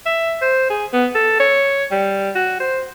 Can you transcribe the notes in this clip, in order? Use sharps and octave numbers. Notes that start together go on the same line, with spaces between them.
E5
C5
G#4
B3
A4
C#5
G3
F#4
C5